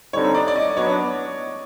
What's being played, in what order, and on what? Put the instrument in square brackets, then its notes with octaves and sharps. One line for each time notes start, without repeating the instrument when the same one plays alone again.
[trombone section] D3 G3 C4 D#4 [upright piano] C#5
[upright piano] D5
D5
D#5
[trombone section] F#3 B3 D4 [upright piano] C#5